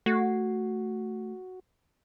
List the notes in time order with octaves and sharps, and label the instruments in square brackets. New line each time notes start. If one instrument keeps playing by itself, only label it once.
[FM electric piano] A3 [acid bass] F#4